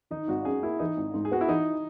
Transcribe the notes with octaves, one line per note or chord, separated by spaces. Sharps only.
D#3 D#4
G#1 F#4
F#2 G#4
A#3 E4
E3 D#4
G#1
G#2
G#4
B3 F#4
E4
E3 D#4